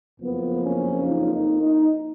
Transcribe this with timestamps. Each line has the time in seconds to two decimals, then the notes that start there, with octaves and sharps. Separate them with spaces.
0.21 F#1 F2 F3 A#3 B3
0.63 C#4
1.05 D#4
1.34 D#4
1.61 D#4